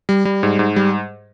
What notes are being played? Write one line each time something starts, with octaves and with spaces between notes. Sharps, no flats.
G3
G3
G#2
G#2
G3